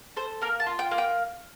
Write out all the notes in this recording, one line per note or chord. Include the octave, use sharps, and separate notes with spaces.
A4 C5
A#3 A#4
A5
F4
G5
A#3
G5